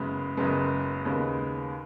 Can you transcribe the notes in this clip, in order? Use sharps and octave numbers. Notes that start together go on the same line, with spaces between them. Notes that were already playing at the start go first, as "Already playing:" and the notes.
Already playing: F#1 F#2 C#3 G#3 B3
F#1 F#2 C#3 G#3 B3
D#2 C#3 G#3 B3